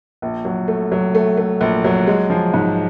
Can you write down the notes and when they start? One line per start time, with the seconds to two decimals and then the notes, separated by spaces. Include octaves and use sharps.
0.22 A#1
0.45 F#3
0.68 A3
0.92 F#3
1.15 A3
1.37 A3
1.61 A#1
1.84 F#3
2.07 G#3
2.30 F3
2.54 G#2